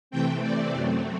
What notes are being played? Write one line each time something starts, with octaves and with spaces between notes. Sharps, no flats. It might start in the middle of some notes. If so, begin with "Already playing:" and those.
C3 E3 A3 C4 G5
D5
F#2 F#3 A3 C4